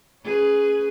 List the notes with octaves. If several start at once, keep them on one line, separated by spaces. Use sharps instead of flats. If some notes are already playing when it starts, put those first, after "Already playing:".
C#4 G#4 B4